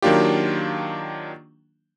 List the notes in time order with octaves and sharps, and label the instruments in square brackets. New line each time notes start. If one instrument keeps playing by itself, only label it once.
[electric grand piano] D#3 F#3 A#3 D4 F4 G4